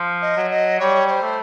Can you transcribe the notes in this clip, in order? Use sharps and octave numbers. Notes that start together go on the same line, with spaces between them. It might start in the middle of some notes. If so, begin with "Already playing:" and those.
Already playing: F3
D#5
F#3
D#5
G3 C#5
C#5
C5
A3